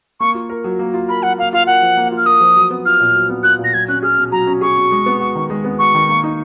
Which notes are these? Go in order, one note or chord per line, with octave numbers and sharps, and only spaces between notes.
A#3 C#6
F4
A#4
F#3
A#3
F4
A#4 B5
F#3 F#5
A#3 F5
F4 F5
A#4 F#5
F3
A#3
F4
F6
A#4 D#6
F3
F#3
B3
F4 F6
A#2
F#3
B3
F4 F#6
A#2
A#6
F#3 G#6
C#4 F#6
G#4 F6
B2
F#3 A#5
C#4
G#4 C#6
B2
G#3
B3
F#4
D#3
G#3
B3
F#4 C#6
D#3
A#3
D#4